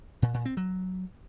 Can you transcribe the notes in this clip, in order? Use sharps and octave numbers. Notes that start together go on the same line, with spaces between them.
A#2
A#2
C4
F#3